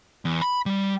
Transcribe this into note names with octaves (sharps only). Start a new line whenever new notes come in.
E2
B5
G3